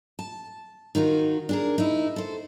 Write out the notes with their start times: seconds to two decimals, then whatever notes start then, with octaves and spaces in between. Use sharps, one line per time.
0.19 A5
0.95 D#3 D#4 F4 F#4
1.49 D4 G#4 A#4
1.78 D#4 E4
2.16 A4 C5